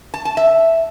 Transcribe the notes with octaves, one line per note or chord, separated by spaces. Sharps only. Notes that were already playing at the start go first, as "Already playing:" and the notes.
A5
A5
E5